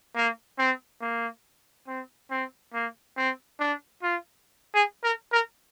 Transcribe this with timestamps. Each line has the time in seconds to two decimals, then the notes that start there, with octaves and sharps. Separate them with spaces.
0.15 A#3
0.58 C4
1.01 A#3
1.87 C4
2.31 C4
2.73 A#3
3.17 C4
3.60 D4
4.02 F4
4.74 G#4
5.03 A#4
5.32 A#4